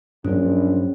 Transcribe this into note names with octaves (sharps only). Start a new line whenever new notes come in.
A#1 G2 F#3 C#4 D4